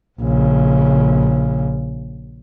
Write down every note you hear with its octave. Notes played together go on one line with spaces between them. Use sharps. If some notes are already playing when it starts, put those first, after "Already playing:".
A#1 C#3